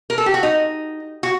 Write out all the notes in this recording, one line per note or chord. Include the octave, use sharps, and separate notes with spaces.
A#4
A4
G4
F#4
D#4
F#4